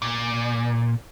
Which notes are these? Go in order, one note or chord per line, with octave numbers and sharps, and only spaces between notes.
A#2